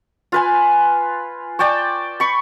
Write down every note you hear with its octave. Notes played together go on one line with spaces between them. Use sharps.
F4 B4 G#5
D5 G5 A5 C#6
B5 C#6